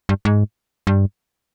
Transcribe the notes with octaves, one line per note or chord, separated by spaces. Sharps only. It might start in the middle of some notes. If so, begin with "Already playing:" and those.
G2
G#2
G2